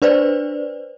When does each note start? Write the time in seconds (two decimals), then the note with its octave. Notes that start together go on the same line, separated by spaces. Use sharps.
0.02 D4 B4 C5 D5